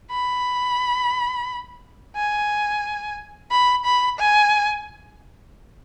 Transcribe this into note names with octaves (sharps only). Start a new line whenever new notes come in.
B5
G#5
B5
B5
G#5